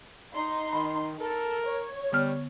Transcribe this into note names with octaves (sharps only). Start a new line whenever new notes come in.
D#4 C6
D#3 B5
A4 A#4
C#5
D3 G3 B3 F6